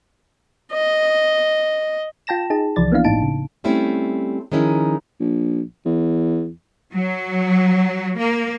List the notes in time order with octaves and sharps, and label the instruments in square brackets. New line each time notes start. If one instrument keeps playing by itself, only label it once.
[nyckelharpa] D#5
[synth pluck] F4 G5 A5 A#6 E7
D#4 G#4 A5
C2 E3 F3 D5 A6
A#3 B3 D4 E4 F5
G1 A2 D#4 A5 D7
C#3
[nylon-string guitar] G3 A3 C4 C#4 E4 G4
D#3 F3 G#3 C#4 D#4 E4
[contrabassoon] A#1
E2
[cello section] F#3
A#3